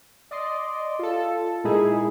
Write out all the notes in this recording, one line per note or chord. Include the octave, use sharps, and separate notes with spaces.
D5 D#5 C6
F4 A4
A#2 G#3 D#4 E4 G#4